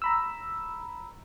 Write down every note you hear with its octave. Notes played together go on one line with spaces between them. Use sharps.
A#5 B5 E6